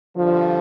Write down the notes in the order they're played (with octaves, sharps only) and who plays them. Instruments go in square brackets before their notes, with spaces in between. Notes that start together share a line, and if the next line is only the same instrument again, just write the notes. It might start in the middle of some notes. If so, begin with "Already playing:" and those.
[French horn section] G2 D3 F3